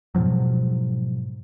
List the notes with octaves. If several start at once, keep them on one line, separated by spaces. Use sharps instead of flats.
G#2 B2 F3 F#3